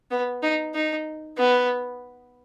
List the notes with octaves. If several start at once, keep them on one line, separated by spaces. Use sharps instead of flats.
B3
D#4
D#4
B3